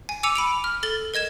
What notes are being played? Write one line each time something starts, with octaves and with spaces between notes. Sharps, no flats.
G#5
G#5 D6 E6 C#7 D#7 F7
B5 D7 F7
F6
A4 A6 G7
A#4 D#5 G#6 E7